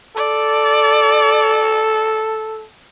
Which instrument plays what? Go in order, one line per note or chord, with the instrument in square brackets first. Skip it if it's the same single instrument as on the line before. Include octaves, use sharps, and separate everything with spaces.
[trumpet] A4 [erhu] D5